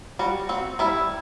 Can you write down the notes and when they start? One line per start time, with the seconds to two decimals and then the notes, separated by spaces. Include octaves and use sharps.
0.19 G3 F#4
0.49 C4 F#4
0.79 G3 E4